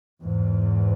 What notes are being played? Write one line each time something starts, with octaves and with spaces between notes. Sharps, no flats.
E2 G#2